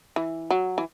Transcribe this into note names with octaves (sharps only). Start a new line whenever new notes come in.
E3
F#3
E3